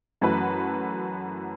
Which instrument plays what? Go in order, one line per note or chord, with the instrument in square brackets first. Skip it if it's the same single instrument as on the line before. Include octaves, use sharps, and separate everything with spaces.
[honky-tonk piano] F#2 E3 A3 F#4 B4